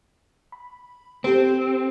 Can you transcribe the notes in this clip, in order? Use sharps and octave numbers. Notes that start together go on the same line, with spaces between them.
B5
C4 G4 A4 C5